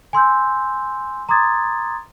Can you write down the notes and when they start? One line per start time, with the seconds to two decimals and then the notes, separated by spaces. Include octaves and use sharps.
0.13 G#5 C6 E6 G6
1.29 A#5 C6 D6 D#6 G#6 A6